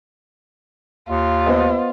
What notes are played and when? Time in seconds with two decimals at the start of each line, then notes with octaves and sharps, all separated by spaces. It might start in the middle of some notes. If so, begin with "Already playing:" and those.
1.09 D#2 F4
1.46 B3 C5 D#5